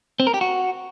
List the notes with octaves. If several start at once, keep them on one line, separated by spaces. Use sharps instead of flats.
C4
A#4
G4
F#4